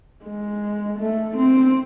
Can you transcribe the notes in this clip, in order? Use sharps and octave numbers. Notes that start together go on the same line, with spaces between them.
G#3
A3
C4